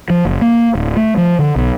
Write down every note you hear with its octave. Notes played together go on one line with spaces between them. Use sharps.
F3
F#1
A#3
D1
A3
F3
D3
B1